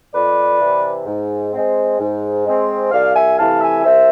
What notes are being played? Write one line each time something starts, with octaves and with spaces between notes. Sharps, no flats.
F2 B4 D5
C3 E3
G#2
G#3 C4
G#2
G#3 C4
C2 D5 F5
E5 G#5
C3 E3 A3 F5 A5
E5 G#5
C2 C5 E5